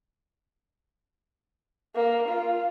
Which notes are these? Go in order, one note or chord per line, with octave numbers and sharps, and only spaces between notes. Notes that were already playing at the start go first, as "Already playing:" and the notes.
A#3
F4